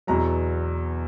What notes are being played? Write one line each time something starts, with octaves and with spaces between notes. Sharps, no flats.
E2 B2 F#3 A#5